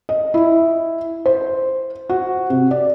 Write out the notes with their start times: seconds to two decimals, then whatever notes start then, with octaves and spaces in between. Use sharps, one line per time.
0.09 D#5
0.34 E4
1.26 C5
2.09 F#4
2.50 C3
2.71 D5